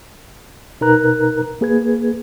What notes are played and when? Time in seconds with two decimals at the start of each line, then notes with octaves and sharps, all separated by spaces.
0.81 B2 D#4 A#4 B4 A#5 F#6
1.61 A#3 G#4 B4 G#6